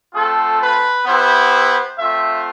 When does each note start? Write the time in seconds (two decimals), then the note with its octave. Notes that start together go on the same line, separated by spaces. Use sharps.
0.15 A3 C4 F4 A4
0.61 B4
1.06 B3 E4 G4 C5
1.98 A3 C4 F4 E5